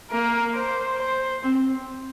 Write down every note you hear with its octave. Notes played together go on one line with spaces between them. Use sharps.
A#3 A#4
C5
C5
C4